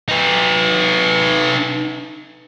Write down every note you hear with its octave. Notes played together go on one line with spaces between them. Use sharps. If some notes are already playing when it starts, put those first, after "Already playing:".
D#4 B4